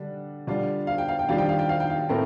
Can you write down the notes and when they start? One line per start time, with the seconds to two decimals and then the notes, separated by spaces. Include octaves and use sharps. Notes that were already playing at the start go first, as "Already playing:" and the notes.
Already playing: D3 G3 D4
0.47 D3 G3 D4 F4
0.87 F5
0.98 G5
1.09 F5
1.19 G5
1.29 D#3 G3 D4 F4 F5
1.38 G5
1.49 F5
1.59 G5
1.69 F5
1.80 G5
1.90 F5
2.09 A2 A3 C4 A#4